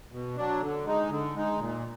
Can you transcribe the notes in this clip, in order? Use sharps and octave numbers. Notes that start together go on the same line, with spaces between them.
B2
F#3 D4
D3
G#3 D#4
D3
G#3 D#4
A#2